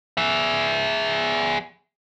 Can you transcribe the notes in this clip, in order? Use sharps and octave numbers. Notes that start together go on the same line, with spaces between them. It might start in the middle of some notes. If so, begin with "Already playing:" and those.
G#4 E5